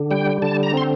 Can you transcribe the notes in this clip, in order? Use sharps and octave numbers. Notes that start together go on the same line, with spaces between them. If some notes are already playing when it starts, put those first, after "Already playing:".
Already playing: D3
G3 G5
D3 A5
A#5
C4 C6